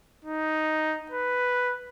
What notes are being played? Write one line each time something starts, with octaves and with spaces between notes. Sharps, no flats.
D#4
B4